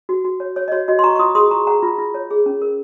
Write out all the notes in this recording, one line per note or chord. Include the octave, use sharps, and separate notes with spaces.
F#4
F#4
C#5
C#5
D#5
F#4 C#5
F#4 D#5
C6
F#4 A#5 C#6
C#6
F4 C6 D#6
G#4 C6 D#6
F4 A#5 C#6
G#4 F#5 A#5
F4
F4
C#5
G#4
C#4
A#4